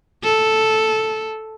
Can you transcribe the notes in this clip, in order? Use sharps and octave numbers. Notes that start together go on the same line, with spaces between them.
A4